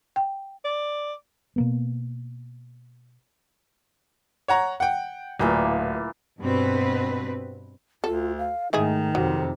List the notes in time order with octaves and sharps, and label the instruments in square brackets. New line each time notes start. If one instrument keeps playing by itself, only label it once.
[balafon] G5
[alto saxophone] D5
[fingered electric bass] B2 A#3 B3
[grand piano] C#5 F#5 A#5
F#5 G5
[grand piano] D1 [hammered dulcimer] A#2 E3 A#3
[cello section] G2 B2 C4 B4
[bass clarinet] D2 [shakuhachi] F4 [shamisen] A4
[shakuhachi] F5
[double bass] G#2 A3 [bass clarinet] D#3 [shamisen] G#3 E4 G#4 [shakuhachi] D#4
[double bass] F2 C3 [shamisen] F#3